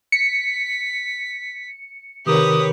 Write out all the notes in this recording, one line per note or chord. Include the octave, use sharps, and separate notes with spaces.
B6 C#7
C3 D#3 G4 A#4 B4 C#5 D#6